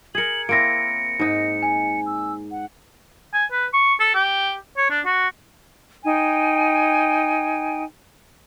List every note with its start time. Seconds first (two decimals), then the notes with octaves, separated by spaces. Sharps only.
0.15 G#4 A#4 G#6 C#7 F#7
0.49 A#3 C4 E4 A#6 C#7 D7
1.20 G#2 D#4
1.62 G#5
2.06 E6
2.51 F#5
3.33 G#5
3.51 B4
3.73 C#6
4.00 A4
4.14 G4
4.77 C#5
4.90 D4
5.05 F#4
6.05 D#4 G5 G#5